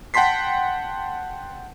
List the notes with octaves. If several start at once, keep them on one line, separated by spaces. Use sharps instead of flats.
F#5 G5 A5 C6 B6 C7